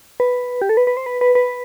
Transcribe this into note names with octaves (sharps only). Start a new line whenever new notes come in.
B4
G4
A4
B4
B4
C5
B4
B4
B4